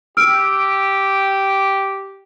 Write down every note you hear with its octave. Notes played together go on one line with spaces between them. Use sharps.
G4 E6 F6 D7